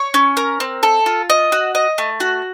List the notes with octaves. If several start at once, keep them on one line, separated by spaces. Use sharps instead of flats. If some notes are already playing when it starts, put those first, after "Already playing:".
Already playing: C#5
C#4
A#4
C4
A4
F4
D#5
F#4
D#5
A3
F#4